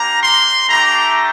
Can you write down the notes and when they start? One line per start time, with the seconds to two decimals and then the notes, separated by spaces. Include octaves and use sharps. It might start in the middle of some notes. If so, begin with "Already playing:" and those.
Already playing: A#3 D4 G4 A#5
0.22 C6
0.69 A3 D4 G4 A#5